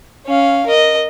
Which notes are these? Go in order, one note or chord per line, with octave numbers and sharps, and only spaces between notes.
C#4 F5
A#4 D#5